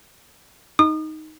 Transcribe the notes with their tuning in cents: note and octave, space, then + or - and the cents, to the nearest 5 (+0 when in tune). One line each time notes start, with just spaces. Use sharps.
D#4 +5 D#6 -35